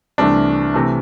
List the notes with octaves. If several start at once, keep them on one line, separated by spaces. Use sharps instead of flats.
C2 C3 E3 A3 D4
C3 E3 A3